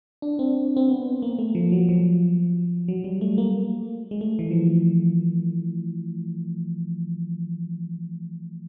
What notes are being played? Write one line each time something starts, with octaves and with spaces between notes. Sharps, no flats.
D4
C4
C4
B3
A#3
A3
F3
F#3
F3
F#3
G3
A3
A#3
G#3
A3
E3
F3